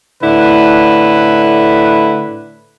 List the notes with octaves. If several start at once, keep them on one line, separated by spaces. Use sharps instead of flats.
A2 D3 E4 B4